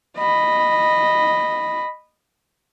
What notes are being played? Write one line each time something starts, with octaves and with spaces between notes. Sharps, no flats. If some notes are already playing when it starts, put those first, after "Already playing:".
D#5 B5